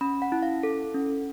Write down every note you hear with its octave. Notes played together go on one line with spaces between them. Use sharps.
C#4 B5
F#5
E4
F5
A4
C#4